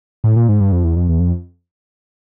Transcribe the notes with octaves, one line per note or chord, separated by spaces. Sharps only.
A2
A#2
G#2
G2
F2
E2
F2
E2
F2